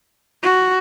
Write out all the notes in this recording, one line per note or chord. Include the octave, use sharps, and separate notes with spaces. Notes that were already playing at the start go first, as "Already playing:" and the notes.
F#4